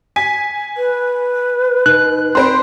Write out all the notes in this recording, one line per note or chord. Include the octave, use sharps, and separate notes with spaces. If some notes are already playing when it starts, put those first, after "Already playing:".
G#5 B6
B4
D#4 F#6
C4 C5 B5 C6 D7